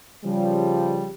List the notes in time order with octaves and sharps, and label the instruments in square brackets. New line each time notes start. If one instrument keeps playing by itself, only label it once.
[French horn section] C#3 F3 G3